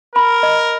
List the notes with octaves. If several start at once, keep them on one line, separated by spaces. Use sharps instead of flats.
A#4 B5
D#5